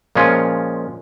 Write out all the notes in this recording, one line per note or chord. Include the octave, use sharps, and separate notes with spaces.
A#2 F3 G#3 C#4 F4